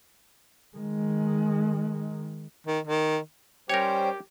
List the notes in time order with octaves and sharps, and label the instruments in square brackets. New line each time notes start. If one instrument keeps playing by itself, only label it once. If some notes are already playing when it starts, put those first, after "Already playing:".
[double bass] D#3 G#3
[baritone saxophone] D#3
D#3
[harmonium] G3 C#4 C5 [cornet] G4 [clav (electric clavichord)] A#4 C#5 [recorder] G5